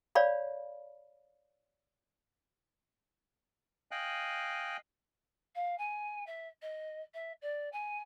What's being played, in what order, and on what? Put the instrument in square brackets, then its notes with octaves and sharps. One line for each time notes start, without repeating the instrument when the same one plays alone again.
[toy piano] C#5 D5 F5 B5
[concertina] D#5 F5 G5 G#5 F#6
[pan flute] F5
G#5
E5
D#5
E5
D5
G#5